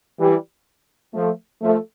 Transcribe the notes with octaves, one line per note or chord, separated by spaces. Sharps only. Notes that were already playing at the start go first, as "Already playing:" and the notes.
E3 G3
F3 A3
F3 A3